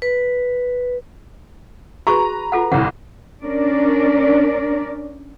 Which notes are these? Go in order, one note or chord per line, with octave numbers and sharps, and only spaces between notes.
B4
F#4 G#4 B4 A#5 C#6
F4 A4 F#5
G1 C2 F#5
C#4 D4 A#4 D5